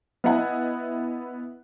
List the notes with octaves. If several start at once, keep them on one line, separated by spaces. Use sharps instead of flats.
B3 E4 D#5 E5 F#5 G#5